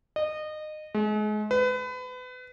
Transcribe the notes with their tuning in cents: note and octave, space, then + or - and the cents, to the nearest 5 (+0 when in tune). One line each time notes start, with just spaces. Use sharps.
D#5 -25
G#3 +35
B4 +30